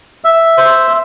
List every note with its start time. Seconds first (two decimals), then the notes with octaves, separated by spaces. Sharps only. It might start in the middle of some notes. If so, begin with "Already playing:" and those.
0.24 E5
0.58 C5